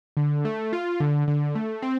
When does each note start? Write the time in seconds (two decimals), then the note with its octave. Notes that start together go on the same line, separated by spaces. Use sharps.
0.17 D3
0.45 A3
0.73 F4
1.00 D3
1.28 D3
1.55 A3
1.82 C4